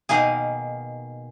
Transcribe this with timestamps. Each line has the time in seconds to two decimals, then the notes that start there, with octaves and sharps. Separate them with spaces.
0.09 B2 D#3 A#3 G#4